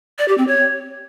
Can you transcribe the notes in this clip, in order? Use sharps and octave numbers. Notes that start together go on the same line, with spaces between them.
D5
G4
C4
C#5